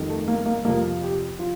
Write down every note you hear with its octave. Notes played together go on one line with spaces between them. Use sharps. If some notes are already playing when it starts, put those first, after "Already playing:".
Already playing: F2 D#3 G3
A3
A#3
A#3
F2 C3 F3 A#3
G4
F3 F4